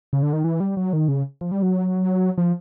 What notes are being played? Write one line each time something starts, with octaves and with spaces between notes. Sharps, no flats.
C#3
D3
D#3
E3
G3
F#3
D#3
C#3
F3
G3
F#3
F3